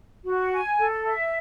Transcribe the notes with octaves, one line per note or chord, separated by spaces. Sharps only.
F#4
G#5
A4
E5